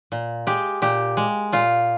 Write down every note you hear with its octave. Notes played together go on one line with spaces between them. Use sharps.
A#2
G#3 G4
A#2 G4
G#3
A#2 F4